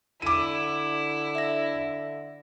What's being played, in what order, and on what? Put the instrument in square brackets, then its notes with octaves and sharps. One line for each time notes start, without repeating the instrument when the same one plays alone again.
[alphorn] D3 [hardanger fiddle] E4 [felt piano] D6 D#7
[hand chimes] E5 A#6